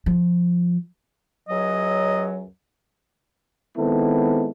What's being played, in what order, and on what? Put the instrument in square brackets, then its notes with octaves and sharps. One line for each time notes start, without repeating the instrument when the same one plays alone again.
[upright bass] F3
[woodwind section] C#2 F#2 F#3 [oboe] D#5
[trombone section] D#3 G#3 B3 C4 E4 A4